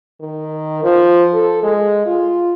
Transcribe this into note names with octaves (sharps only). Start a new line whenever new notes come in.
D#3
F3
A4
G#3
F4